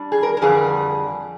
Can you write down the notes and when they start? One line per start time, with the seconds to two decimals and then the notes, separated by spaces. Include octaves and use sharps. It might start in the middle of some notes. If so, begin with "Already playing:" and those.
Already playing: G3 D4
0.12 G#4
0.23 A#4
0.37 A#4
0.42 F2 D3 G3 G#4